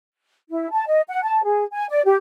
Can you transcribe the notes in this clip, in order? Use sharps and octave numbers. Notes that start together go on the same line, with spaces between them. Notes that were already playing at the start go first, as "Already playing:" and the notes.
E4
A5
D#5
F#5
A5
G#4
G#5
D5
G4